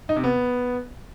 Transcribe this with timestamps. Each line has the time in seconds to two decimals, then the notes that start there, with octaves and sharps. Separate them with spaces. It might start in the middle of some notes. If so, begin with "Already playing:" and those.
0.09 D#4
0.16 C3
0.24 B3